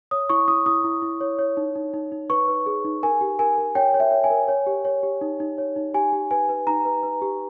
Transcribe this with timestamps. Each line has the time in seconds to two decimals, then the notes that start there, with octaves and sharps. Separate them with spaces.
0.11 C#5 D#6
0.29 E4 C#6
0.48 E4 D#6
0.66 E4 D#6
0.84 E4
1.02 E4
1.21 C#5
1.39 C#5
1.57 D#4
1.76 D#4
1.94 D#4
2.12 D#4
2.30 B4 C#6
2.48 B4
2.66 G#4
2.85 D#4
3.03 A#4 G#5
3.21 G4
3.39 A#4 G#5
3.58 A#4
3.75 C#5 G5
3.94 C#5
4.00 E5
4.12 C#5
4.24 G#5
4.30 A#4
4.48 C#5
4.67 G4
4.85 C#5
5.03 G4
5.21 D#4
5.40 D#4
5.58 C#5
5.76 D#4
5.94 G4 G#5
6.13 G4
6.31 B4 G#5
6.49 B4
6.67 D#4 A#5
6.85 B4
7.03 B4
7.22 G4